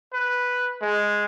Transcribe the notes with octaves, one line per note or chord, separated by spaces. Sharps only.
B4
G#3